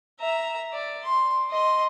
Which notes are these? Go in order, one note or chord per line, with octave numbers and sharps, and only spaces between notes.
E5 A#5
D5
C6
D#5 C6